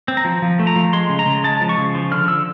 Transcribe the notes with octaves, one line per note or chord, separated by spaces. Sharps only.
C4
A#5
F3
F3
A3
A#5
F3
G#3 C6
C#3
A#5
C#3
G#3 A5
F3
C#6
C#3
F3
D3 F6
D3 E6